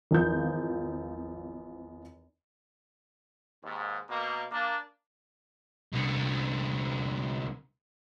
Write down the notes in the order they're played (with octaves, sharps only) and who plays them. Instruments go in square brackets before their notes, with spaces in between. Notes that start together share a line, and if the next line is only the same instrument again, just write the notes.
[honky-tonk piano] G#1 E2 F3 G6
[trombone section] D#2 G#2
B2 A#3
A#3 D4
[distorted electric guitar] C2 D3